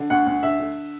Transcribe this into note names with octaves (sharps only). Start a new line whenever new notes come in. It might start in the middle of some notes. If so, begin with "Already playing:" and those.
Already playing: D3
D2 F#5
D2
D3 E5
D3